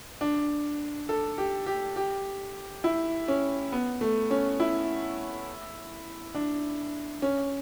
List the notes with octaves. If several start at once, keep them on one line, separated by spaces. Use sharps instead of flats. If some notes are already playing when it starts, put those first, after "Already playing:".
D4
A4
G4
G4
G4
E4
C#4
B3
A3
C#4
E4
D4
C#4